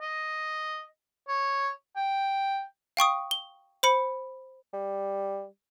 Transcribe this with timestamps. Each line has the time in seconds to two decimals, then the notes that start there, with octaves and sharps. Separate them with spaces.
0.01 D#5
1.29 C#5
1.96 G5
2.97 F5 G5 C#6 D#6
3.31 G7
3.83 C5 B5 C#7
4.73 G3